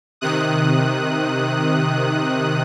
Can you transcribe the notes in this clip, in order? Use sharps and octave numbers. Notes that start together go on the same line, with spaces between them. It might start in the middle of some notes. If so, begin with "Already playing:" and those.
C3 D#3 D#6 F#6